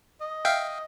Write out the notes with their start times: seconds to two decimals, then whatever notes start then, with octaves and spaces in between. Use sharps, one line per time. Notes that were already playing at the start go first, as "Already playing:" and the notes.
0.21 D#5
0.45 E5 F5 G5